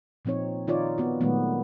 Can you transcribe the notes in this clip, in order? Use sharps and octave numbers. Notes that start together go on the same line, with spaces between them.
A#2 F3 C4 D#4 C#5
D#3 D#4 F4 C#5 D5
B3 F#4
A#2 D#3 F#3 G#3 A3 B3